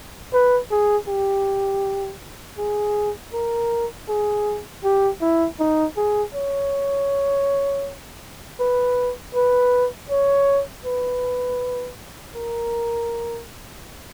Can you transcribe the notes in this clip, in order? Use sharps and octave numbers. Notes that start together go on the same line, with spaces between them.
B4
G#4
G4
G#4
A#4
G#4
G4
E4
D#4
G#4
C#5
B4
B4
C#5
B4
A#4